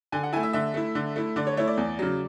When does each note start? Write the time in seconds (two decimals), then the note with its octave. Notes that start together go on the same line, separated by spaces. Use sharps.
0.12 D3 G#5
0.23 F#5
0.33 E4 G#5
0.36 A3
0.43 E5
0.53 D3 E5
0.74 A3 E4
0.95 D3
1.16 A3 E4
1.36 D3 D5
1.47 C#5
1.57 A3 E4 C#5
1.67 D5
1.77 E2
1.99 C#3 F#3